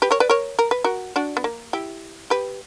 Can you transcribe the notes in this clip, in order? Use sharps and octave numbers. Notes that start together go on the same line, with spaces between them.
G4 B4
A#4 C#5
B4 D5
A#4 C#5
A#4
B4
F#4 A#4
D4 F#4
B3
A#3
E4 G4
G4 B4